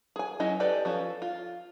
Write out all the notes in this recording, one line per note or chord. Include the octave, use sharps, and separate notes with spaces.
G#4 G#5
F#3 C#4 E4 D#5
G4 A4 B4 D5
F3 C#4 A4
F4